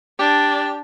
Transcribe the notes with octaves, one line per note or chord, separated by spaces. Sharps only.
D4 G4